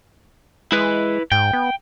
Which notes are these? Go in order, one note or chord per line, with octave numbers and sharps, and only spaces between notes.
G#3 E4 B4
G#2 G5
B3